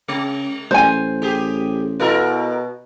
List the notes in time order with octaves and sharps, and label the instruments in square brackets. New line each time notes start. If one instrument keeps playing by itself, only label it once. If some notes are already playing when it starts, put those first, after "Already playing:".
[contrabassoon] C#3 [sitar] G#3
[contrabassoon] A1 [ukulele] C5 G#5
[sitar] G4 G#4
[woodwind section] B2 [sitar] E4 A4 A#4